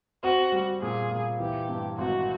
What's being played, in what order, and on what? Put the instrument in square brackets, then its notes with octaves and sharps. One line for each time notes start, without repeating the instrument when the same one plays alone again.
[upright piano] C4 [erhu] F#4
[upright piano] G3
[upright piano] A#2 [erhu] G#4
[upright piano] A#2
[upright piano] E3 [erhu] G4
[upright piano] G2
[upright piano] G#1 [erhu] F#4